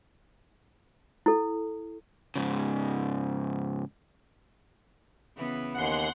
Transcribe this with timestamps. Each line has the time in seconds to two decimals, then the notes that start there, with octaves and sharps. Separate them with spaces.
1.26 E4 A4
2.36 G#2 C#3
5.36 C#3 E3 B3
5.74 D#2 F#5 C6